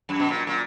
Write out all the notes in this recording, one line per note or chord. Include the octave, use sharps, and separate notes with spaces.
F#2
B2
A#2
A#2